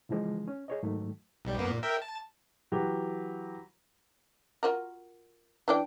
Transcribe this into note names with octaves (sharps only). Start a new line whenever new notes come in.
C#3 E3 F3 G#3
C#4
G#4 C#5 D#5
G#2 D#3 F#3 A3
B1 G3
F#2 A#3 B3
A#2
A#4 E5 G5
A5
E3 F#3 G4
F4 F#4 A#4
E3 D4 G5